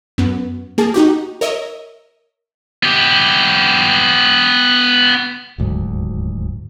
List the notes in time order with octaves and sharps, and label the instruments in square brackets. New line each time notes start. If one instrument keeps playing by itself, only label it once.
[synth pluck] F#2 B3
A#3 G#4 A5
D#4 F#4 G4
A#4 C#5 D#5 E5
[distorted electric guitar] B3 G4
[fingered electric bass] D#1 D2 G#2 F#3